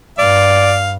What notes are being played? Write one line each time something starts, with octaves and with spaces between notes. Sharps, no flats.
G2 D5 F5